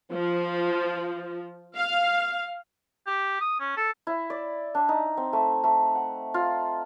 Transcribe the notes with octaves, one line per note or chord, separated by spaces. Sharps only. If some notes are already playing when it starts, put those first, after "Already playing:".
F3
F5
G4
D#6
C#4
A4
E4
D5
D4
D#4
C4
A3
A3
F#5
F4